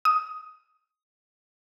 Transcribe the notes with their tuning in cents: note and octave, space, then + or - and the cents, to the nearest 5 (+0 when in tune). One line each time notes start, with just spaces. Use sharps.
D#6 +10